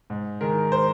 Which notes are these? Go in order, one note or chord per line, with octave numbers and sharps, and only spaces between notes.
G#2
D#3 G#3 A#4
C5